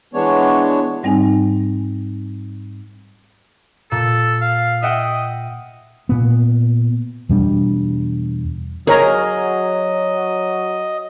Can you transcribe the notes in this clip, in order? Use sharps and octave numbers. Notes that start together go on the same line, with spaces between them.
E3 G#3 B3 D4 C#5
G#2 G3 C4 D#4 G#5
A#2 A4
F5
D#5 E5 F#5 G5
A#2 B3
E2 B2 G3 D4
F#3 G#4 A#4 C#5 D#5 A#5